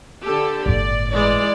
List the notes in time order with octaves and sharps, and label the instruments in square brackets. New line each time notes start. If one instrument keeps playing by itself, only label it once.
[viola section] D3 G4 A4
[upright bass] G1 A2 [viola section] D5
[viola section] E3 G#3 D5